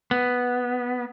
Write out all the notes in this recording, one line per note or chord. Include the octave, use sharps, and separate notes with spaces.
B3